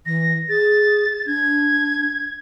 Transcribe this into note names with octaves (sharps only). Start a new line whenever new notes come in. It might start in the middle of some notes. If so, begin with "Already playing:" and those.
E3 A#6
G#4 A6
D4 G#6